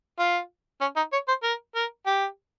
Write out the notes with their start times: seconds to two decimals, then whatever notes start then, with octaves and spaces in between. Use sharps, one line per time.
0.19 F4
0.81 C#4
0.96 D#4
1.12 C#5
1.28 C5
1.43 A#4
1.75 A#4
2.06 G4